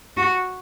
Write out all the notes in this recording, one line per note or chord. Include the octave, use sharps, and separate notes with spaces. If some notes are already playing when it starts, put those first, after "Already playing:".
F#4